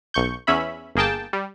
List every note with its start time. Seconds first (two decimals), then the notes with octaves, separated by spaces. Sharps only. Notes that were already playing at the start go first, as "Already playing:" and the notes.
0.14 B1 C#6 G6
0.47 E2 C#4 E5 B5
0.96 G1 A#3 G#4 G5 A5
1.33 G3